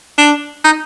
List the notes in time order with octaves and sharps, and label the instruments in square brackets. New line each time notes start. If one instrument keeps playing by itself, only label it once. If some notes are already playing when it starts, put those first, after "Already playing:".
[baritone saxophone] D4
D#4